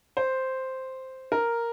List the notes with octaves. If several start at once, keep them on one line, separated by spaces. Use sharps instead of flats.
C5
A#4